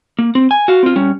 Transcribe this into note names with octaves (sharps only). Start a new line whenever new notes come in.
A#3
C4
G#5
F#4 F5
C4 F4
G3 C#4